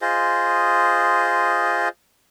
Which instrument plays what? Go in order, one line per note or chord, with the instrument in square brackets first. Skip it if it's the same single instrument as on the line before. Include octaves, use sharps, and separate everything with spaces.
[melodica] F4 G#4 C5 D#5